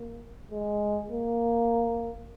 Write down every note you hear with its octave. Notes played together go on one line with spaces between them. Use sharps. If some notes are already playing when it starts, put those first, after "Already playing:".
Already playing: A#3
G#3
A#3